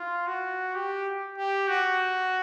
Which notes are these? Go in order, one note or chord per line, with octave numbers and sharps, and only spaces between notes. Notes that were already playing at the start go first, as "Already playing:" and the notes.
Already playing: F4
F#4
G4
G4
F#4